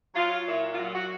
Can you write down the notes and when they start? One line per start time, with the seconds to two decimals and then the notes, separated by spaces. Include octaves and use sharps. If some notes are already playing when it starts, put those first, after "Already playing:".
0.14 F#3 F4
0.30 F4
0.46 A#2 E4
0.73 F4
0.78 F#3 F#4
0.93 F#4